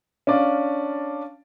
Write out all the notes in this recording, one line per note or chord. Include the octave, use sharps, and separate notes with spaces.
C#4 D4 D5 F5